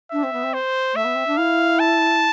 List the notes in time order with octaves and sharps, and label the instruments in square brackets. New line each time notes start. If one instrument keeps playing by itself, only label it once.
[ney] D4 [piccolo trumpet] E5
[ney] C4
B3
C4
[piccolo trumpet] C5
[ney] A3 [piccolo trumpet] E5
[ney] B3
C4
D4
[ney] E4 [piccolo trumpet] F5
[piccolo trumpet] A5